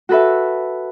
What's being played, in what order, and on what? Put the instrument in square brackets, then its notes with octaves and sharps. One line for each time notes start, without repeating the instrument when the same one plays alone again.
[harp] F#4 A4 B4 E5